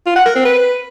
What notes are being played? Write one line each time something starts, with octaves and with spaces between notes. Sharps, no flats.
F4
F#5
A#4
C4
B4